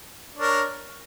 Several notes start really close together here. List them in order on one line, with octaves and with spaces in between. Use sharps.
D4 C#5 A#4